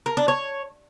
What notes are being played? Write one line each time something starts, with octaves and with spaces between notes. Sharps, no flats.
A#4
D4
C#5